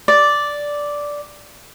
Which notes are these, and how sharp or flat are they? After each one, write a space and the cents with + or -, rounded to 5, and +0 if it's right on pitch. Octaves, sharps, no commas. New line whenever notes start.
D5 -5